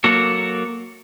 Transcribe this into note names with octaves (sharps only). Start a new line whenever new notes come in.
F#3 A#3 F#4 A4